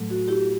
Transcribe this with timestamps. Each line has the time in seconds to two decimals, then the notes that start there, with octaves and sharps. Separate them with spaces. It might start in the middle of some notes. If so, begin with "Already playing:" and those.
Already playing: A2 F#3 A3
0.10 F#4
0.28 E4 G4